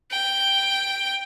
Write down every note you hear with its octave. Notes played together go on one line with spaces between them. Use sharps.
G5